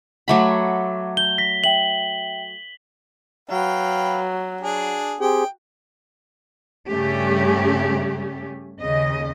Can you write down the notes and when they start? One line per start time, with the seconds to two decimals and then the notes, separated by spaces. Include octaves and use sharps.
0.28 F#3 A3 F#5 B5 D6
1.17 G6 G7
1.38 A#6 B6
1.64 E5 G5 F#7
3.50 F#3 B4 F5 G5
4.61 D4 G#4
5.21 C4 G4 G#4 G5
6.89 G2 C#3 G3 A3 C#4 G4
8.80 D#2 C#3 D#5